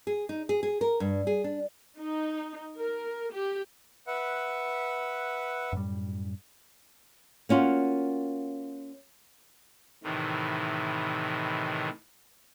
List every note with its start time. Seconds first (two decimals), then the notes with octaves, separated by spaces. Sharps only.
0.07 G#4
0.29 D#4
0.49 G#4
0.63 G#4
0.81 A#4
1.00 G2
1.27 G#4
1.44 D4
1.99 D#4
2.79 A#4
3.33 G4
4.07 B4 E5 F#5
5.73 F#2 A2 G3
7.49 A#3 C#4 F4 F#4
10.04 A2 C3 D#3 E3